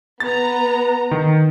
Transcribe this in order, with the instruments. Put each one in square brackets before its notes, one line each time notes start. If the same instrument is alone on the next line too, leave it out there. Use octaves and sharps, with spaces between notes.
[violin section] B3 A#5 [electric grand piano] A6
[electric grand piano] D#3